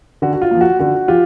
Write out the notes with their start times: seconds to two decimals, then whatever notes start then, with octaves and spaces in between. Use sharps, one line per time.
0.22 D3 F#4
0.34 F#4
0.42 F4
0.51 F3 A#3
0.61 F#4
0.79 D3 F#4
1.08 F3 F4 G4